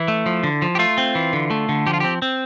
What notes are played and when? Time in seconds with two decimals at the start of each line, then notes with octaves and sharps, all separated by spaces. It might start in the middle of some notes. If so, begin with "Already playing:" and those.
Already playing: E3 E4
0.08 A3
0.26 F3
0.43 D3
0.62 F3
0.75 G4
0.79 A3 F4
0.98 C4
1.15 E3
1.33 D3
1.50 A3
1.69 D3
1.86 F3 G4
1.94 F4
2.00 C4 G4
2.22 C4